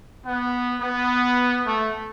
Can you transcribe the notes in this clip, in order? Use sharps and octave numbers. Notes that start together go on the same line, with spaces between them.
B3
B3
A3